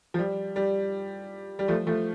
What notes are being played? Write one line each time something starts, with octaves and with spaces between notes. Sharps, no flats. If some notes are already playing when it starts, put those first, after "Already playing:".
F3
G3
G3
G3
F3 A3
F3 A3